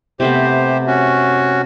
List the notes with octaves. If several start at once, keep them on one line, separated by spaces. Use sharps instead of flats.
C3 A3 B3 G4 C5
C#4 F#4